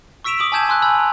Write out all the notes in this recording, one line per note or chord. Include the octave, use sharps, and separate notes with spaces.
C#6 E6 B6 D7 E7 F7
D6 D#6 D7 F#7
G#5 A5 E6 G6 G#6 E7
G#5 C6 E6 F#6
G#5 B5 E6 F#6 F#7
A#5